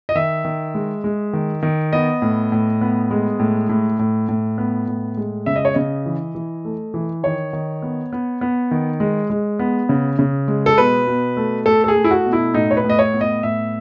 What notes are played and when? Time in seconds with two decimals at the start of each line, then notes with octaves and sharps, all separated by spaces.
0.09 D#5
0.15 D#3 E5
0.45 D#3
0.74 G#3
1.04 G#3
1.33 D#3
1.63 D#3
1.93 B3 D#5
2.22 A2
2.52 A2
2.81 B3
3.11 G#3
3.40 A2
3.69 A2
3.99 A2
4.29 A2
4.58 B3
4.88 A2
5.17 G#3
5.46 C#3 E5
5.56 D#5
5.65 C#5
5.74 C#3 D#5
6.06 E3
6.35 E3
6.65 A3
6.94 E3
7.23 D#3 C#5
7.53 D#3
7.82 B3
8.13 B3
8.41 B3
8.71 D#3
9.00 G#3
9.30 G#3
9.59 B3
9.89 C#3
10.19 C#3
10.48 G#3
10.66 A4
10.78 B2 B4
11.07 B2
11.37 A3
11.66 A3 A4
11.84 A4
11.88 G#4
11.96 A3
12.04 E4
12.11 F#4
12.26 B2
12.33 E4
12.54 A2 D#4
12.71 C#5
12.77 B4
12.84 A2
12.90 D#5
12.99 C#5
13.13 B3
13.21 D#5
13.43 A2 E5